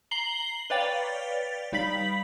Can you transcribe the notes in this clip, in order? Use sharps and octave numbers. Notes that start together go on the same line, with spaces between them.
A#5 C7 F#7 G7
B4 C#5 D5 F5 G5 A6
G3 D#4 F5 B5 B6 F#7